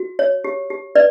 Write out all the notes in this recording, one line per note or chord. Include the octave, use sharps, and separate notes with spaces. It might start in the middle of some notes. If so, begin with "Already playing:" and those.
Already playing: F#4
C#5
G4
G4
B4 D5